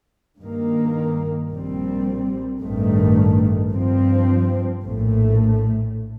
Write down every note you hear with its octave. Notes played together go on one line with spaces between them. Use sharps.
G2 D#3 A#3
A#1 A#2 G3 C4
A1 G2 D#3 A3
G2 F3 C4
A#1 A2 A3